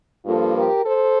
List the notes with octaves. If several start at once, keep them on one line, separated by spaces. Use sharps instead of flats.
G2 F3 A#3 F4 A4
G4 A#4
A4 C5